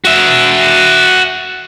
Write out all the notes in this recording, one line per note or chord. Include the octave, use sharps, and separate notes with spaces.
F#4 E5